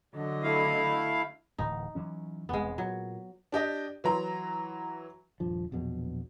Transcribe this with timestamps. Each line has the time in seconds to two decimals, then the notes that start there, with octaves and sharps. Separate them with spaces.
0.14 D3 F#3 D#5
0.43 A3 E4 F5
1.58 D1 A2 E3 D#4
1.95 E3 F#3 C#4
2.49 E1 C2 G#3 B3
2.78 A#2 F#3
3.52 D4 G4 D#5
4.04 E3 F#3 A#5 C6
5.40 D#1 G2 F3
5.72 A#1 E2 B2 F#3